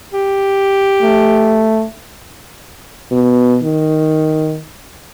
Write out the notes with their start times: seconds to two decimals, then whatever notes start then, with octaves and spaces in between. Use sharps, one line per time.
0.13 G4
1.02 A3
3.11 B2
3.63 D#3